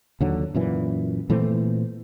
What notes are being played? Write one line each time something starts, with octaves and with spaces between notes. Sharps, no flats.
D#2 D3 F#3
F#2 A#2 E3
A#2 E3 A3 C4